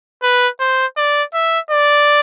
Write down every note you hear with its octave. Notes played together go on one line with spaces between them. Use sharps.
B4
C5
D5
E5
D5